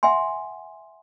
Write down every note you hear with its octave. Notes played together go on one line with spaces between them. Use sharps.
E5 F#5 G#5 C6